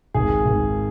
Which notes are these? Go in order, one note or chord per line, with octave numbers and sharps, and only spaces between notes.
G#1 G#4
G#1